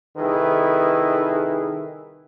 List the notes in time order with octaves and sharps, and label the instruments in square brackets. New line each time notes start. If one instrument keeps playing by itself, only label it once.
[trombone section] C2 D#3 E4 G#4 A4 B4